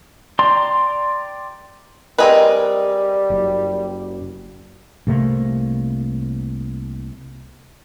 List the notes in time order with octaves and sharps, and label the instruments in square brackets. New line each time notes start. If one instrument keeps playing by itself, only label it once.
[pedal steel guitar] D5 G5 A#5 C6
[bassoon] G3 [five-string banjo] C4 G#4 B4 [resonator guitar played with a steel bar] A#4 D#5
[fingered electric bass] F#1
[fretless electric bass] C2 C3 A3 A#3